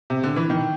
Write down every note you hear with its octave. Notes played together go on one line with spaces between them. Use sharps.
C3
D3
E3
D#3